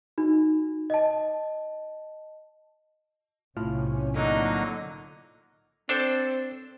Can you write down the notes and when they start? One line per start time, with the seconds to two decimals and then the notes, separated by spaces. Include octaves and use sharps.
0.18 D#4 F#4
0.90 D#5 A5
3.57 B1 A2 C3 C#4 F4 F6
4.15 D3 F#3 A#3 D#4
5.89 C4 D4 A4 C5